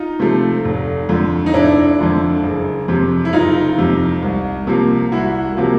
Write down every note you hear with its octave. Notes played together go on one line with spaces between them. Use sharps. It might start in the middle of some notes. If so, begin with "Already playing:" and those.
Already playing: D#4 F4
C3 F3 A3
F1
F2 D3 F3
D#4
F1 D4 E4
F2 D3 F3
F#1
F2 C3
E4
F#1 D#4 F4
F2 C3
C2
C3 F3 A#3
C2 E4 F#4
C3 F3 A#3